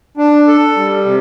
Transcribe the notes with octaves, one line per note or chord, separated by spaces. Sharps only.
D4
A4
G3
C3